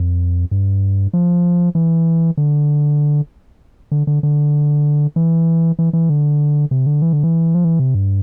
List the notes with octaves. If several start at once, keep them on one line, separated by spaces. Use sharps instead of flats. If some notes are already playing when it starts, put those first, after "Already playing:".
Already playing: F2
G2
F3
E3
D3
D3
D3
D3
E3
E3
E3
D3
C3
D3
E3
D3
E3
F3
E3
C3
G2